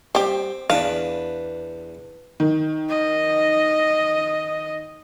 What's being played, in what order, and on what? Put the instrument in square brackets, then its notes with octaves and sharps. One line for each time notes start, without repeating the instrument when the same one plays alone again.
[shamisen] G3 G4 [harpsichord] C4
[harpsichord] E2 D4 B4 [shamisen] F5
[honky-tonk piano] D#3
[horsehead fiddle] D#5